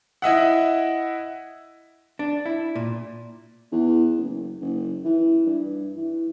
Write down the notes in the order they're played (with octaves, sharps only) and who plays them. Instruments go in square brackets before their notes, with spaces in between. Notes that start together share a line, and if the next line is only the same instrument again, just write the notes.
[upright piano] E4 D#5 E5 F#5
[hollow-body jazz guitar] D4
E4
A#2
[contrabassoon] E2
F#1
F#1
E3
G2
E3